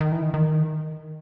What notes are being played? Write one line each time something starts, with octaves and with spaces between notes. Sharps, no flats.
D#3
E3
D#3
D#3